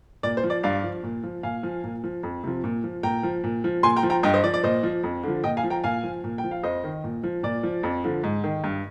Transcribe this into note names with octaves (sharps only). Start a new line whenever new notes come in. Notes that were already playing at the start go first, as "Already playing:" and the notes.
A#2 D5
C5
F3
D5
G2 D5 F5
F3
A#2
F3
A#2 F5 G#5
F3
A#2
F3
F2
C3 F3
A#2
F3
A#2 G5 A#5
F3
A#2
F3
A#2 G#5 C6
G5 A#5
F3
G5 A#5
G2 D#5 G5
C5 D#5
F3 D5
D5
A#2 C5 D#5
F3
F2
D3 F3
A#2 D#5 G5
F5 G#5
F3
G5 A#5
A#2 F5 G#5
F3
A#2
G5
F3
F5
F2 C5 D#5
D#3
A#2
F3
A#2 D5
F3
F2
D3 F3
G#2
D#3
G2